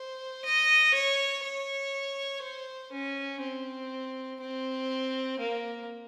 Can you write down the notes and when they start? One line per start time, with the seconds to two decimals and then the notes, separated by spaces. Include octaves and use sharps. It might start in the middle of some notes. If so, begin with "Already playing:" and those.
Already playing: C5
0.45 D#5
0.94 C#5
1.43 C#5
2.42 C5
2.92 C#4
3.41 C4
4.40 C4
5.40 A#3